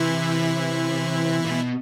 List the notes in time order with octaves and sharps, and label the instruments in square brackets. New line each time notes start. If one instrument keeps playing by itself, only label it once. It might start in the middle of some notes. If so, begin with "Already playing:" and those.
Already playing: [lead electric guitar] C3 [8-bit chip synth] E3 E4
[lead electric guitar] A#2
B2